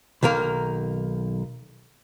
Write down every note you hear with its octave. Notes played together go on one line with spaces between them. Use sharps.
B1 D#3 A#3 A#4